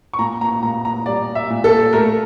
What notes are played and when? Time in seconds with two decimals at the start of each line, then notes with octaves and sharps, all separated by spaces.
0.14 C#6
0.19 A#2 A#5
0.41 A#5
0.63 A#2 A#5
0.85 A#5
1.06 G3 D5
1.35 E5
1.50 A#2
1.64 A4
1.93 A3 A#4